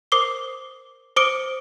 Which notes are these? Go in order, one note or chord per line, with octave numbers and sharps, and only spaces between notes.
A#4 C5 D6 D#6 C7 G7
C5 D6 D#6 C#7 D7 G7